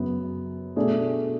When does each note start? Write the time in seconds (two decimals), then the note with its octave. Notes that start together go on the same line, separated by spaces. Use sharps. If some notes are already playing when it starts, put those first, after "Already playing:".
Already playing: F#2 C#3 F#3 B3
0.76 B2 A3 D4 G#4